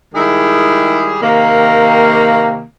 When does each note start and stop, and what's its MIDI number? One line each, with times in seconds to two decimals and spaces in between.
0.14 1.16 51
0.14 1.16 55
0.14 1.16 56
0.14 1.16 64
0.14 1.16 68
1.21 2.63 48
1.21 2.63 51
1.21 2.63 58